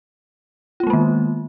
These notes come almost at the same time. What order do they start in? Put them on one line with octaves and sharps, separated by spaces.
F4 B3 G#3 A#3 D#3